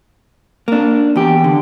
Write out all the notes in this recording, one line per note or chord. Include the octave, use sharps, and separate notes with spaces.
A#3 D4
E2 G4
D3